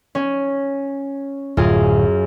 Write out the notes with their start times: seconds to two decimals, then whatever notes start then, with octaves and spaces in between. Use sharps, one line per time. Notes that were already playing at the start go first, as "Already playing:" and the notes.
0.15 C#4
1.57 D1 F#2 F4 G#4